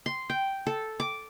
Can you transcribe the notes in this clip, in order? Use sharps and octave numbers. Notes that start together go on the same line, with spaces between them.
C6
G5
A4
D6